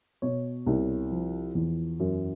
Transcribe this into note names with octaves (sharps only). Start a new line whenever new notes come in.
B2 C#5
C2
F3
E2
F#2